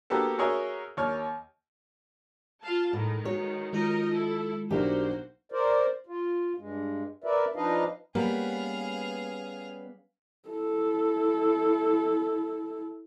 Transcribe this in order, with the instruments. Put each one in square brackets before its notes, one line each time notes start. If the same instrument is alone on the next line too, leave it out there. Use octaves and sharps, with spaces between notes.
[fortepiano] A#3 B3 F#4 G4 A4
F#4 G#4 A#4 C#5 D#5 E5
D#2 C#5 F6
[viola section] F4 F5 A5
[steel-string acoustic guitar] A2 [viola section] D#3 G#3
[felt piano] F#4 [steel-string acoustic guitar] C#5
[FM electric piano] D#3 G#3 F4 [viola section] D#4 A#4 D#5
[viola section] E4 A4
[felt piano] B1 D4 D#4 [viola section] A#3 F#4 C5 [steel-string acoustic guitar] G4 A#4
[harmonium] A#4 C5 D5
F4
G2 G#3
A#4 B4 D5 E5
F3 D4 D#4 B4 D#5 F5
[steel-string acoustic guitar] G3 B3 C#4 [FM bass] A#3 [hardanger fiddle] G#4 F5
[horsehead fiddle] E4 A4